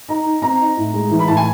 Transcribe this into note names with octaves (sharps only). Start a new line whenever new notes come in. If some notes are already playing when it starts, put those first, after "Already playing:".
D#4 A#5
D#4
C4 A#5
D#4
A2
G#3
E3
B5
A2 A5
G#5